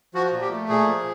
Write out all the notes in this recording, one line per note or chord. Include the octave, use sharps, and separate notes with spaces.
F3 F#4
A#2
G4
A3
A#2 G#4
F3